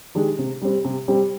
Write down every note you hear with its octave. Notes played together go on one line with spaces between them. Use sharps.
D#3 G#3 D4 G4
C3
G3 C4 G4
C3
G3 C4 G4